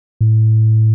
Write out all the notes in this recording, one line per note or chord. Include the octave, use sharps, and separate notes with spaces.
A2